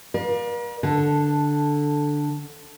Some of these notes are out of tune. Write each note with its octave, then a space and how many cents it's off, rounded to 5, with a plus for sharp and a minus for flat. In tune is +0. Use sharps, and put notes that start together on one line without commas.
A#4 +45 D5 +30 F5 +20
D3 +0 A4 +0